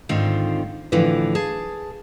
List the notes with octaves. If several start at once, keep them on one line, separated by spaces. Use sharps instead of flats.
G#2 D3 D#3 C4 F4
A2 D3 E3 F3 B4
G#4 A5